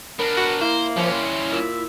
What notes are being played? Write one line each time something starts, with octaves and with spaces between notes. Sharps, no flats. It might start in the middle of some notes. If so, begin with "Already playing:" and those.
B3 D4 A#4 B5
F#4
A#3 E4 C5
F3 G3 C#4
C6
A#2 E5